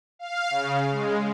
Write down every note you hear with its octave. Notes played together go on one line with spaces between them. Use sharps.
F5
C#3
G#3